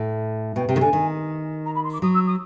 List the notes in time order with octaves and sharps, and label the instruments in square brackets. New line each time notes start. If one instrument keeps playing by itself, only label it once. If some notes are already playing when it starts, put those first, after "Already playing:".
Already playing: [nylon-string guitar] A2
[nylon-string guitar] B2 [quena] G5
[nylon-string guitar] C3 [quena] G5
[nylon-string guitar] D#3
[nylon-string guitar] D3 [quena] G#5
[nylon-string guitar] D#3
[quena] A#5
B5
C6
D6
[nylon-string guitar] F#3 [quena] D#6
[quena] E6
D#6